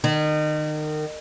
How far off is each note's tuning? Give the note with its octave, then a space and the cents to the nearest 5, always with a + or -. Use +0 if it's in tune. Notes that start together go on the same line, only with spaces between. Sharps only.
D#3 -30